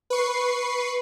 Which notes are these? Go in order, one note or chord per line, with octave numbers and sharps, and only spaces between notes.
B4 C#6 C7